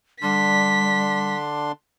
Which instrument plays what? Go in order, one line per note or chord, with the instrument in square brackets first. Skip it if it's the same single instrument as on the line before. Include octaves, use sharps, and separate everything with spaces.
[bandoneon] D3 D4 C6 [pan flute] G3 [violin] B6